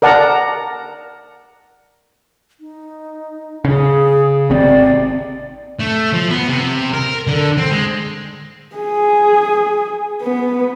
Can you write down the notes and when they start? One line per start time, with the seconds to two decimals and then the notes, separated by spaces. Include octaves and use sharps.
0.02 A#4 D5 F#5 A5 A#5
2.60 D#4
3.65 C#3 G#4
4.50 G#1 C3 C4 D5
5.79 A3
6.13 F3
6.30 B3
6.48 C3
6.93 A#4
7.27 D3
7.58 C4
7.71 G#3
8.77 G#4
10.22 B3